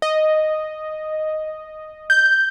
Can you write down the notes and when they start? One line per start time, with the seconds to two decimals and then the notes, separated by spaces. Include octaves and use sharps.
0.02 D#5
2.10 G6